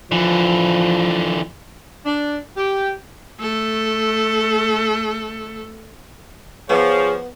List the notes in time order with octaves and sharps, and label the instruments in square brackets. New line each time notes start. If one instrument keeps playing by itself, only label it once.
[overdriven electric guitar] D3 E3 [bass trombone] F3
[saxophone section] D4
G4
[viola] A3 A4
[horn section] F3 [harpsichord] B3 [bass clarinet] G#4 [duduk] C#5